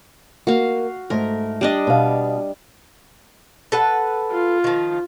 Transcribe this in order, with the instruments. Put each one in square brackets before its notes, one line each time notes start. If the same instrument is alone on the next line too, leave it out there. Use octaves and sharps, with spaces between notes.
[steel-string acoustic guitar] A#3 [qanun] F#4 F5
[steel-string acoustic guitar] G#2 A3 [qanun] A#4
[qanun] G3 D4 D#5
[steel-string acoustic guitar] B2 F5
[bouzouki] A4 B4 F#5
[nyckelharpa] F4
[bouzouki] D#3 F3